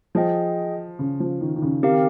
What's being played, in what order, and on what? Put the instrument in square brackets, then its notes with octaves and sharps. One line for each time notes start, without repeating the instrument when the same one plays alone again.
[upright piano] F3 [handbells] G#4 D#5 G5
[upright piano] C#3
F3
D#3
D#3
C#3
[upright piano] D#3 [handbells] C4 G4 A#4 F5